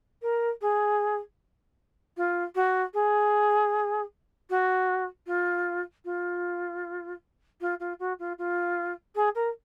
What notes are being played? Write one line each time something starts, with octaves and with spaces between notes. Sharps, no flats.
A#4
G#4
F4
F#4
G#4
F#4
F4
F4
F4
F4
F#4
F4
F4
G#4
A#4